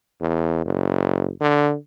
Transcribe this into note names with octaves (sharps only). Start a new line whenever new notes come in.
E2
F#1
D3